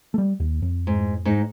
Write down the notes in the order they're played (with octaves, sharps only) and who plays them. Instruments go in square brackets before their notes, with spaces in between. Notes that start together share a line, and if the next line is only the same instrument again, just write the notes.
[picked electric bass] G3 A3
D#2
F2
[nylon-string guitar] G#2
G#2 D#4